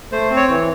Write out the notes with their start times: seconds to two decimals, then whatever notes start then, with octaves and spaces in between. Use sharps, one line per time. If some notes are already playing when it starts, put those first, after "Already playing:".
0.12 A3 C5
0.30 C4
0.36 C#5
0.49 E3